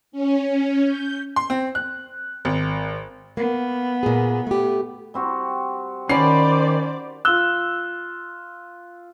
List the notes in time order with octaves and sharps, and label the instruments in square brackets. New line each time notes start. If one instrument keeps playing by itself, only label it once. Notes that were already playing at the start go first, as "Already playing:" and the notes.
[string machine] C#4
G6
[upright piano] C6
C4
F#6
G#1
[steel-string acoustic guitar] A#3 [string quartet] B3
[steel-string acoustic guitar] A#2 G#4
A3 G4
[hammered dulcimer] G3 C4 F#4
[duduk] D#3 [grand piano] C#4 C7 [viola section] C5 D5 [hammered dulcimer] F#5 B5
[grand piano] F4 E6 [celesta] F#6 G7